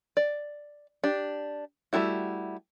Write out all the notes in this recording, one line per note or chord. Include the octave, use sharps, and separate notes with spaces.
D5
D4 G4
G3 A3 E4 F#4